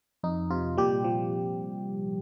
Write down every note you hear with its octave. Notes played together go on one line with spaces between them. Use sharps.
F2 D#4
C3 F4
A#2 G3 G4
F3